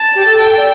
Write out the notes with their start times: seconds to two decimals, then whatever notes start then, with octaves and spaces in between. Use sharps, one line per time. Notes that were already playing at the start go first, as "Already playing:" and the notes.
Already playing: A5
0.15 G4
0.25 A4
0.41 G5
0.57 D5